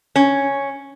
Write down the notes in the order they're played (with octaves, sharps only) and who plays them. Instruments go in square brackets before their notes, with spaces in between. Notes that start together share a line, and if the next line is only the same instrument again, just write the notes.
[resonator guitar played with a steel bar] C#4